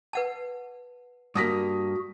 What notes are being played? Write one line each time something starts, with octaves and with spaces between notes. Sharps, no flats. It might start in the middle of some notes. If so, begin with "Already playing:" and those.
B4 F#5 A5
G2 A#3 F#4 D#6 A#6 B6